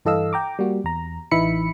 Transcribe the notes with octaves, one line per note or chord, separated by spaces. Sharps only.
G2 E3 A4 D#5 F5 E6
G5 A#5 D6
G3 A#3 F#4
E2 A#5
A1 E3 D#4 E5 B5 C#7